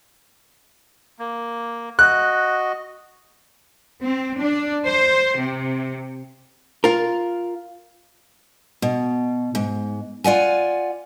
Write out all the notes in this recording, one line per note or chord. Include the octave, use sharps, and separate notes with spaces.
A#3
F#4 D#5 F#6
C4
D4
C5
C3
F4 A#4
B2
G#2
F4 D5 F#5 G#5